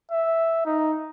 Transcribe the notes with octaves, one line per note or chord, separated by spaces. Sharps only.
E5
D#4